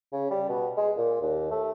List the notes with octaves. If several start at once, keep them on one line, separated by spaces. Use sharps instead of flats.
C#3
G3
B2
G#3
A#2
D#2
A3